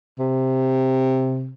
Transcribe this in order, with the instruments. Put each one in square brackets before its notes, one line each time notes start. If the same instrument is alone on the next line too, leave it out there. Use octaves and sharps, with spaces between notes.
[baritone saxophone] C3